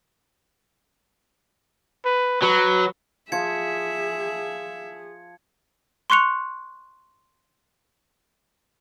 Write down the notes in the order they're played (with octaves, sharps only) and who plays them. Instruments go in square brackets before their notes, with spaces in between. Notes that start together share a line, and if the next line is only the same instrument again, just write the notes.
[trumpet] B4
[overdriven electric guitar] F#3 [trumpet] B4
[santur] F3 C#6 [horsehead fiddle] G#4 [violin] E5 [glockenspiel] G#6 C#7
[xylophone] C6 C#6 F#6 C#7 F7